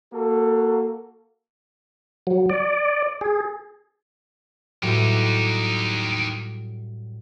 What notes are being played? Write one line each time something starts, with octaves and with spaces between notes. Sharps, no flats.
A#3 F#4 A4
F#3
D5
G#4
A2 F#3 G3 D#4 G4